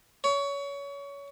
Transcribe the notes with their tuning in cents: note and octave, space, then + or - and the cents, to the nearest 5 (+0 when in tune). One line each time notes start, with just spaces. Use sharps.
C#5 +25